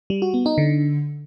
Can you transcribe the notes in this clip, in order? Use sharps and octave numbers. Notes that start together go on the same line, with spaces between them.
G3
F#4
B3
D#4
D3